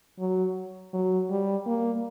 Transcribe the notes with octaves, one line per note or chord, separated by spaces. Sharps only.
F#3
F#3
G3
A#3